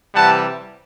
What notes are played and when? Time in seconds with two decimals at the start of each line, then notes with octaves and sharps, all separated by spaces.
0.14 C3 E3 G3 F#5 A5